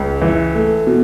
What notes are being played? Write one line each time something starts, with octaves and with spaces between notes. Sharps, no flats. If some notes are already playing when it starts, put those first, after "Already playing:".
Already playing: C#2
E3
A3
B2